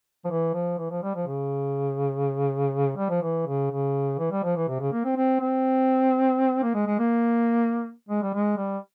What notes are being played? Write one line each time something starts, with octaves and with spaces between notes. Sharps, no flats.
F3
E3
F3
E3
F3
G3
F3
C#3
G3
F3
E3
C#3
C#3
E3
G3
F3
E3
C3
C#3
A#3
C4
C4
C4
A#3
G#3
G#3
A#3
G#3
G3
G#3
G3